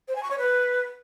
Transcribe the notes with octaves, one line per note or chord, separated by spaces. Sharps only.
C5
G#5
C#6
C#5
B4